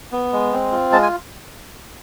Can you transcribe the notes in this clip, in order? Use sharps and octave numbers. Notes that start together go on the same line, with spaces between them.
B3
G#3
C4
F4
G#3 A5
G#5